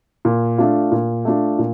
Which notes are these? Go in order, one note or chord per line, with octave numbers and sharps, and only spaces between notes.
A#2
A3 D4 F4
A#2
A3 D4 F4
A#2